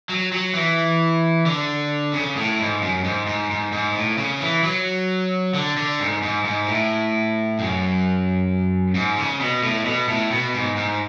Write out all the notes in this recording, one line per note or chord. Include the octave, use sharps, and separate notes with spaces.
F#3
F#3
E3
D3
C#3
A2
G#2
F#2
G#2
G#2
G#2
G#2
A2
C#3
E3
F#3
D3
D3
G#2
G#2
G#2
A2
F#2
G#2
C#3
B2
A2
B2
A2
B2
G#2
G#2